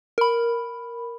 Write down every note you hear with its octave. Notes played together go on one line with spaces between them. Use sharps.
A#4 B5